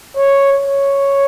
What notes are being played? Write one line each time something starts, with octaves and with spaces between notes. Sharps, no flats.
C#5
C#5